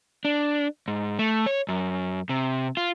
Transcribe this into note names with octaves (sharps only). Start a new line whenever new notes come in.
D4
G#2
A3
C#5
F#2
C3
F4